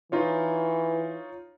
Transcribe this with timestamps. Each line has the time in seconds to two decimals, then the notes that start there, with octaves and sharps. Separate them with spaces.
0.12 E3 D#4 F4 C#5